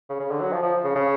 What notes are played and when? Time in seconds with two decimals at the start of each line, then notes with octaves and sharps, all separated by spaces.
0.10 C#3
0.20 C#3
0.31 D3
0.41 F#3
0.53 F3
0.63 F3
0.84 C#3
0.95 C#3